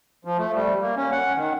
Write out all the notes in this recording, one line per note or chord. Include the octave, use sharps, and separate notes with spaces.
F3
A3
G3
A#3
C#4
F#5
D#3